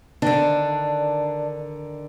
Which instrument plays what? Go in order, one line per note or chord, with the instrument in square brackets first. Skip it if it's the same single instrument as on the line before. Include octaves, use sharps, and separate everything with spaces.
[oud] D3 D#3 [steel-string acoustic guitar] D4